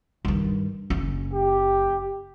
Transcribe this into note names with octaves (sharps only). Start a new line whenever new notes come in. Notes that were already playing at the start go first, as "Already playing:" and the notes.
G2 D#3
F#1 C#4
G4